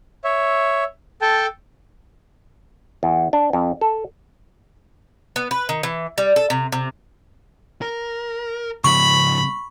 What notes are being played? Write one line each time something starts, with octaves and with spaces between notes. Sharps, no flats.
C#5 E5
A4 G5 A5
E2
D4
F2
A4
B3
B4
D#3
E3
G3
A4
C3
C3
A#4
G#2 C#3 F3 B3 B5 C#6